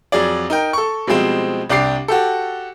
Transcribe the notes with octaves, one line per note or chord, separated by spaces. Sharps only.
F2 F#3 G#4 D5
D#4 A#4 G5
A4 C#6
B2 F3 G3 G#3 C4
C2 D4 G4 D6 C7
F#4 G4 A4